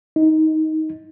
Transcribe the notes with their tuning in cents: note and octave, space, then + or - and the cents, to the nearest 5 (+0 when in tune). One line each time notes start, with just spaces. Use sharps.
D#4 +15